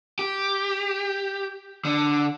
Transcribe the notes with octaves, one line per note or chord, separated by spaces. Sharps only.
G4
D3